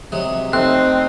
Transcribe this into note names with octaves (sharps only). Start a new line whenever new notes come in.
C3 F#3 G#3
A3 C4 D#4 F#6